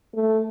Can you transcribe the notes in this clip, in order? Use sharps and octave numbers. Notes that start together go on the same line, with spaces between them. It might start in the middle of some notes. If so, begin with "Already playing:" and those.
A3